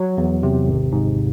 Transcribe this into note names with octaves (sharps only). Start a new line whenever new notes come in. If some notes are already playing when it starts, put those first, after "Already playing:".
Already playing: F#3
E2
C3
G#1
G#2